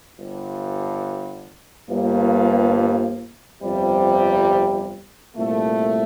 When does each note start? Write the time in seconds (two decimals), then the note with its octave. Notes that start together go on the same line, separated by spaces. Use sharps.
0.17 G1 G2 D3
1.90 G1 G2 F3 A#3
3.63 G1 F2 C3 G3
5.36 C2 A#2 A3